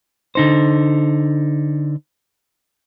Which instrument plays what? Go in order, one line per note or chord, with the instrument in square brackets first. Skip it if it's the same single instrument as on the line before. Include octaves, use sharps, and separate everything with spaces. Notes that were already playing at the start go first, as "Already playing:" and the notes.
[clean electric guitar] D3 D#4 C5